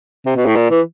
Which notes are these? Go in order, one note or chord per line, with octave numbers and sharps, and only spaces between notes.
C3
B2
A2
A#2
E3